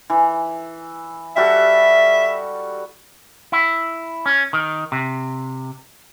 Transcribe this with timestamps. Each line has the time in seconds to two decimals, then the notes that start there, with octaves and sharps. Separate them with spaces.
0.10 E3
1.36 G3 F#4 A4 E5
3.52 E4
4.26 C#4
4.53 D#3
4.92 C3